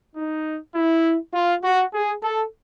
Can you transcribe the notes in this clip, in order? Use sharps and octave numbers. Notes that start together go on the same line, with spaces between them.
D#4
E4
F4
F#4
G#4
A4